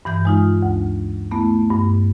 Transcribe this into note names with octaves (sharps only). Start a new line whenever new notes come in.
G2 E3 G6
G#3 D#4 F4
D2
A3 B3 E4
G2